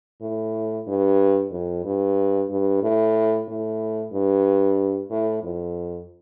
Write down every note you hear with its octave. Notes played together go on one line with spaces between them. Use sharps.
A2
G2
F2
G2
G2
A2
A2
G2
A2
F2